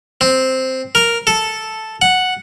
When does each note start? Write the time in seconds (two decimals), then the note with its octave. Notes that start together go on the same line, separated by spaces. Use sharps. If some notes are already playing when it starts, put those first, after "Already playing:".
0.21 C4
0.95 A#4
1.27 A4
2.02 F#5